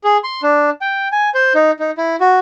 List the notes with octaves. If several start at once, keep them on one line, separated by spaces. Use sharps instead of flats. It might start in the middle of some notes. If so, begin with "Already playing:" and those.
G#4
C6
D4
G5
G#5
C5
D#4
D#4
E4
F#4